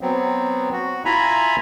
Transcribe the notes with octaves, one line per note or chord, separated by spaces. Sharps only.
F#3 B3 C4
F#4
E4 F4 E5 G#5 A#5 B5